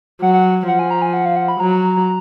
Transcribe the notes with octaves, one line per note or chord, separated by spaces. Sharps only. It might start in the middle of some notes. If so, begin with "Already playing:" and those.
F#3 F#5
F#5
F3 F#5
G#5
A#5
G#5
F#5
F5
F#5
B5
F#3 A#5